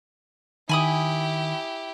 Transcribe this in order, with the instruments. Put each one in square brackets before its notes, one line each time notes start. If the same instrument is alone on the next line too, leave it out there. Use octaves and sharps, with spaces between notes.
[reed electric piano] D#3 [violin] E4 G4 [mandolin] G#5 B5 D#6